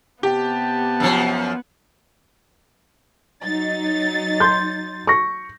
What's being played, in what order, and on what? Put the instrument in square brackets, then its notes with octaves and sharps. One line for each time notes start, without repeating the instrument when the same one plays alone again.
[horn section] C3 A5 [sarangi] B3 [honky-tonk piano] G4
[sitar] F#2 F3
[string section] F#3 D#4 A6
[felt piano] C6 G6
C#6 A#6